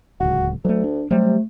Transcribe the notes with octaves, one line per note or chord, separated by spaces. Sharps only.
D1 C#2 F#4
D2 F#3 A3
D4
C3 F#3 G3 A3